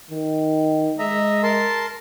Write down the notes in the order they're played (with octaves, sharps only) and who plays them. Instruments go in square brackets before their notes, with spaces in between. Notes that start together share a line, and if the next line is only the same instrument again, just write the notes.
[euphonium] D#3
[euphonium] G#3 [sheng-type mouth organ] D#5 E5 A#5
[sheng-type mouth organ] A#4 A5 C6